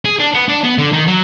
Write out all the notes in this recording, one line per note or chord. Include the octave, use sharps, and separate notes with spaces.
G#4
D4
B3
D4
B3
D3
D#3
F#3